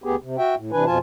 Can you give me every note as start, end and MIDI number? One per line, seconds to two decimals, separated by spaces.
0.04 0.16 38
0.04 0.16 59
0.04 0.16 67
0.04 0.16 68
0.22 0.37 48
0.38 0.55 66
0.38 0.55 76
0.38 0.55 79
0.56 0.71 45
0.72 0.85 48
0.72 0.85 52
0.72 0.85 62
0.72 0.85 71
0.72 0.85 80
0.86 0.98 41
0.86 0.98 47
0.86 0.98 53
0.86 0.98 65
0.86 0.98 80
0.86 0.98 81